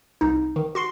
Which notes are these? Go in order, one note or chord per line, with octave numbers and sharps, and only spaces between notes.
C2 D#4
D#3
F#4 C6 C7